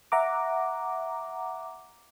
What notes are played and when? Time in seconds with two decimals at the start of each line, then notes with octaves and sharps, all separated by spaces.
0.12 E5 F#5 A#5 D6